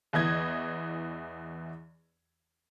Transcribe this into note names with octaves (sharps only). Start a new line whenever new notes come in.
E2 E3 D#5 G#6